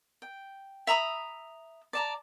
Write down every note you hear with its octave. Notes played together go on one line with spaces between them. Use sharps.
G5
E5 A#5 B5 D#6
D5 A5 A#5